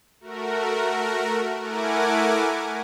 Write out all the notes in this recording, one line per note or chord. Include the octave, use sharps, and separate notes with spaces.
A3 F#4 A#4
A3 E4 A#4 F#5 G#5 D6